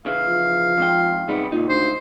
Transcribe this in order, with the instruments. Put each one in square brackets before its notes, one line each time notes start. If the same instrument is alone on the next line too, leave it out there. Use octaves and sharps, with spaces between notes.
[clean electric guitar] C#3 E3 [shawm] F5
[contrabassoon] F3
[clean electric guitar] F2 G#2 G5
[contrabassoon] G#2 [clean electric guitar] C3 G3 B3
[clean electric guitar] C#2 D#4 [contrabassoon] A#2
[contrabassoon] D2 [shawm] C5